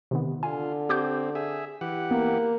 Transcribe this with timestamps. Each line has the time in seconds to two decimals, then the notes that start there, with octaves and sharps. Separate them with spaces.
0.11 C3 D#3 B3
0.43 D3 F4 G#5
0.89 C4 G4 D6 G6
1.35 G#4 E5
1.81 E3 G4 F#5
2.11 A#3 B3